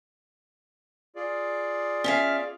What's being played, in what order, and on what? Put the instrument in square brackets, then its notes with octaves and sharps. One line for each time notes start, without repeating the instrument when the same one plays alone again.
[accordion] F4 G#4 D5
[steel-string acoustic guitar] C#4 E5 F5